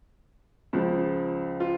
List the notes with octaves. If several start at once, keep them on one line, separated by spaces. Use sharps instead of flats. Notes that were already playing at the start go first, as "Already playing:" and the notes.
C#2 C#3 F3
F4